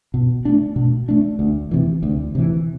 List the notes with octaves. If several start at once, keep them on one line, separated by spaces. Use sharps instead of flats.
B2
A3 D4
B2
A3 D4
D2
C3 E3
D2
C3 E3